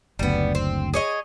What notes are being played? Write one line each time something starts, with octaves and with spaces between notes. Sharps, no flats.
F#1 D2 G3 B3
C4
G#4 C#5 D#5